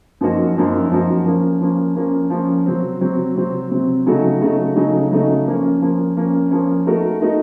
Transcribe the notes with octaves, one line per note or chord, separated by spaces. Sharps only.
F#2 F3 A#3 D#4 F#4
F#2 F3 A#3 D#4 F#4
F#2 F3 A#3 D#4 F#4
F3 A#3 C#4
F3 A#3 C#4
F3 A#3 C#4
F3 A#3 C#4
C3 F#3 C4
C3 F#3 C4
C3 F#3 C4
C3 F#3 C4
C#3 F#3 A3 D#4 F#4
C#3 F#3 A3 D#4 F#4
C#3 F#3 A3 D#4 F#4
C#3 F#3 A3 D#4 F#4
F3 A#3 C#4
F3 A#3 C#4
F3 A#3 C#4
F3 A#3 C#4
A3 D#4 F#4 A#4
A3 D#4 F#4 A#4